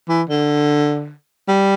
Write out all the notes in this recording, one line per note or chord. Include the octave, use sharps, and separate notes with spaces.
E3
D3
G3